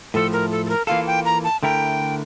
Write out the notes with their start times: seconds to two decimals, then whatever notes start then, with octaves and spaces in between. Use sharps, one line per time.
0.14 A2 F3 A3 A4
0.33 A#4
0.51 A4
0.65 A4
0.69 A#4
0.87 E3 A#3 F4 A4 F5
1.07 G5
1.25 A#5
1.44 A5
1.63 D3 A3 E4 A#4 G5